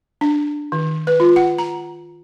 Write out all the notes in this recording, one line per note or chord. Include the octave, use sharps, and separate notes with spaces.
D4
D#3
B4
F4
F#5
A#5